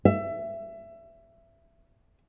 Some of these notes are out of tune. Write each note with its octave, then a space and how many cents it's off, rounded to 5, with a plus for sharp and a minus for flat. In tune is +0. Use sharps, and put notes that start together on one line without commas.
E5 +20